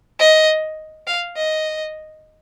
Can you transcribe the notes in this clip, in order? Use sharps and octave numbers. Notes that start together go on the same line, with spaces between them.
D#5
F5
D#5